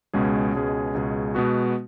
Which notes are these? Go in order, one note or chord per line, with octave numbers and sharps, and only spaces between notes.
C#2 B2 G#3 C#4 G#4
C#2 B2 G#3 C#4 G#4
C#2 B2 G#3 C#4 G#4
B2 G#3 B3 F#4